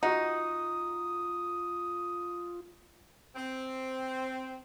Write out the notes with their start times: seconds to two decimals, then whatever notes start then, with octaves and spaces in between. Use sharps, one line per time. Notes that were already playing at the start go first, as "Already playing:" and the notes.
0.03 D#4 F4 F#4 D#5 F#5 D#6
3.36 C4